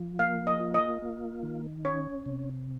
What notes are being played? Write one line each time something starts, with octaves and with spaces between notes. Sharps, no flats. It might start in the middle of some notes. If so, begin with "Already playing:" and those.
Already playing: F3
A#3 F5
D#5
F4
D#5
A#3
D#3
C#4 C#5
C3